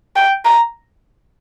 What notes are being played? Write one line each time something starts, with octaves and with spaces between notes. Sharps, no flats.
G5
A#5